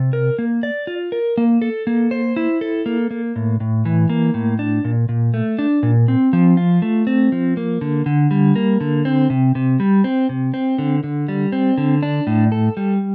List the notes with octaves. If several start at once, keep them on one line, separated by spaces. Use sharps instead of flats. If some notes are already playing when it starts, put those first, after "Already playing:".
Already playing: C3
A#4
A#3
D5
F4
A#4
A#3
A4
A#3
C5
E4
A4
A#3
A#3
A2
A2
E3
A#3
A2
D4
A#2
A#2
A3
D4
A#2
C4
F3
F4
A3
C4
F3
A#3
D3
D3
G3
A#3
D3
C4
C3
C3
G3
C4
C3
C4
D3
D3
G3
C4
D3
D4
A2
A4
G3